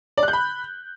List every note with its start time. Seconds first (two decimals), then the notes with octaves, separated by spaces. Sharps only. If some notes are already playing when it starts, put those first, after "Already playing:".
0.18 D5
0.23 F#6
0.28 G6
0.33 B5